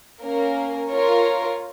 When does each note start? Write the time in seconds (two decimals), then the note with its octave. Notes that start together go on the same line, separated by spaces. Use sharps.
0.22 A#3 C#4 A#4
0.91 F4 A#4 C#5